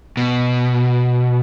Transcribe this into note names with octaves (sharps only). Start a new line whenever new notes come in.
B2